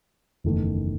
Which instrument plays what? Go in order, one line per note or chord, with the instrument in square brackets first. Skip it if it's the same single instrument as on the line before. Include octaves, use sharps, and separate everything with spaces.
[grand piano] F#1 E2 D#3 A3 D#4